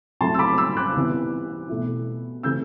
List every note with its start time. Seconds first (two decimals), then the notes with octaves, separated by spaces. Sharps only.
0.21 C3 F#3 A3 E4 A5 C6
0.34 E6
0.39 B5 D6
0.58 C6 E6
0.77 D6 F#6
0.95 C2 C3 E3 B3 E4
1.69 B2 A3 E4
2.43 C3 E3 A3 C4 E6 G6